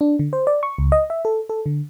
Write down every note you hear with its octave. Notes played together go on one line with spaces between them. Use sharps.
D4
D3
C5
D5
C#6
C#2
D#5
E5
A4
A4
D3